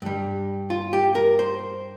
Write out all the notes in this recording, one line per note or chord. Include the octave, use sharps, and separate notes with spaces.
G2 G3
F4
G4
A#4
C5